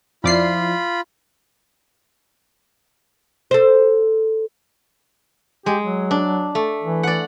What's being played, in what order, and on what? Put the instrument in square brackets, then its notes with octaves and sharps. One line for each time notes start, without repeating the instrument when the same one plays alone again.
[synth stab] F2 D5 C7 [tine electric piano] F3 E4 [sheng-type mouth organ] F4 B5
[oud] A4 C5
[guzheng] G#3 [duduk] G4
[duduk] F#3
[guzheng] D4
A3
[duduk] E3
[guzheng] D5 F#5